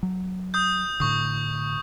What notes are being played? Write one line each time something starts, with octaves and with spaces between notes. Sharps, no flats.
F#3
D#6 G6
A2 D3 C#6 D#6